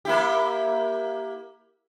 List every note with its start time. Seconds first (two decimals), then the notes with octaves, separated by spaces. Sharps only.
0.05 A#3 E4 G4